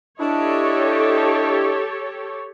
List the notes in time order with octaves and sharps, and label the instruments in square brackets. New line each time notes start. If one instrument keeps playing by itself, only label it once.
[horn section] D4 E4 D#5 [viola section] G4 A4 C#5